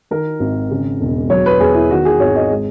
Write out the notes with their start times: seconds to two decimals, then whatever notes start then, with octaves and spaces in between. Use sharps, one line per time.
0.11 D#3 A#4
0.40 G#1
0.71 C#3
1.01 E1
1.30 F#3 C#5
1.46 B4
1.60 E2 G#4
1.75 E4
1.90 D#3 F#4
2.05 G#4
2.20 G#1 C#5
2.36 D#5
2.50 G#3